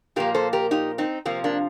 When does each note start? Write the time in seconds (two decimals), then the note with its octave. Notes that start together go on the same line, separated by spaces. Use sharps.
0.16 A#2 F3 A#3 G4 A#4
0.35 A4 C5
0.53 G4 A#4
0.71 D#4 G4
0.98 C4 D#4
1.25 C3 F3 A#3 C4
1.44 A#3 D4